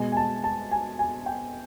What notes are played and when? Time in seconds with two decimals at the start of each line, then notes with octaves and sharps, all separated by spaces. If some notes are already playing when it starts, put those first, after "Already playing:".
Already playing: B2 G#3 G#5
0.12 G#5
0.17 A5
0.44 A5
0.71 G#5
0.99 G#5
1.26 G5